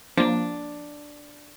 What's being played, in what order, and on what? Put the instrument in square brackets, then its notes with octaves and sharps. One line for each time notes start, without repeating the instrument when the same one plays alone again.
[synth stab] F3 A#3 [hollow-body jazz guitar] D4